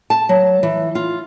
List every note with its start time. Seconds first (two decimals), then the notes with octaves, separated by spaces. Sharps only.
0.10 A5
0.29 F#3
0.63 E3
0.95 F4